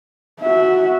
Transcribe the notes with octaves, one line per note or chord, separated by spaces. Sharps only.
F#4 E5